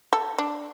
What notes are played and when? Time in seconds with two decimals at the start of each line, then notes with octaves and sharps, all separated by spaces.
0.13 A4
0.38 D4